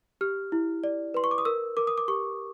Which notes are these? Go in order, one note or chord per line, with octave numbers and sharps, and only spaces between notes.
G4 F6
E4
D5
B4 C6
C#6
D6
D#6
A#4 E6
A#4 D6
D#6
D6
G4 C#6